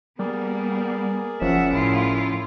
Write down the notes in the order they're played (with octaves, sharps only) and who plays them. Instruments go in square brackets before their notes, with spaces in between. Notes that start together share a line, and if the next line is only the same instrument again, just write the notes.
[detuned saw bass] G3 [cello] A#3 B3 [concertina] G#4 A#4 D5
[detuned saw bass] F#1 [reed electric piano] F3 C#4 [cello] E5 F#5
[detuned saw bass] A2 [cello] E4 F4